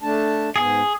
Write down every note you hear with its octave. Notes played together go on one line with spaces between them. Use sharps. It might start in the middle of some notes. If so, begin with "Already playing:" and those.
A3 D4 A5
G#2 B3 G#4